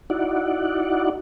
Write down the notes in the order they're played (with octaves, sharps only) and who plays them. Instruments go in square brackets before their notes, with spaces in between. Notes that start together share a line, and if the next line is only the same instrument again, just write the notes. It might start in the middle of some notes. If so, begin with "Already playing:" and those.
[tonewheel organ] D#4 E4 F#4 D5 F#5